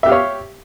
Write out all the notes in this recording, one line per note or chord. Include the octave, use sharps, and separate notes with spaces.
G4 C#5 E5 F5